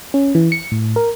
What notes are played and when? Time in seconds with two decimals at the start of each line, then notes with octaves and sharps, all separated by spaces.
0.14 C#4
0.35 E3
0.52 C#7
0.72 A2
0.96 A#4